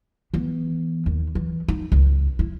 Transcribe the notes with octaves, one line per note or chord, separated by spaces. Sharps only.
E3 B3
D#2
E3
D#4
C#2
E4